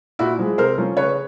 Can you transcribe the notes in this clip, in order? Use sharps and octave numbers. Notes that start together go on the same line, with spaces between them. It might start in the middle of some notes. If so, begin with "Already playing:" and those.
A#2 E4 F#4
F3 G#3
C3 A#4 C5
F3 A3 C#4
C#3 B4 C#5